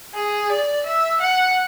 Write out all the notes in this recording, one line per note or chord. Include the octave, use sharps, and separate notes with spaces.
G#4
D5
E5
F#5